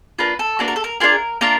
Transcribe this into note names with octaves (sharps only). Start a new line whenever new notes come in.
A#3 D4 F4 B4
A4
A#3 D4 F#4 B4
A#4
A4
A#4
D4 F4 G#4 A#4
A#3 D4 F4 A#4